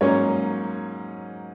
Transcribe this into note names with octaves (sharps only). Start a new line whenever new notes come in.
G#2 F#3 A#3 C#4 C#5